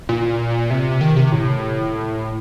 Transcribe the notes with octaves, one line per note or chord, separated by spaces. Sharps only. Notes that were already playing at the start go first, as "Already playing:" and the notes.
A#2
C3
D#3
C3
A2